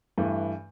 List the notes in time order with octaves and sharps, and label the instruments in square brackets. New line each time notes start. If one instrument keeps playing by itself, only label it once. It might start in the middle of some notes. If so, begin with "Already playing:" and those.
[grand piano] G2 E3 A3